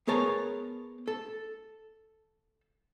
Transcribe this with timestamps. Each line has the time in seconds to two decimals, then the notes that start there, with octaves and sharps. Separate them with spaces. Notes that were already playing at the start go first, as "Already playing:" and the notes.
0.07 B3 G#4 A#4 C#5 A5
1.08 A4